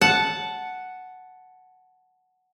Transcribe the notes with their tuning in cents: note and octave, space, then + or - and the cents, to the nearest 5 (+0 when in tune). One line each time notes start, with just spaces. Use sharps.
F#5 +0 A5 -10